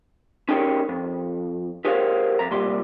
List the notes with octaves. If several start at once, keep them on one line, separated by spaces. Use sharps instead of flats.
C#4 D#4 G4 G#4 A#4 C#5
F2
G4 G#4 A#4 C5 C#5 F5
F2 A#5
C2 A#2 G3 C6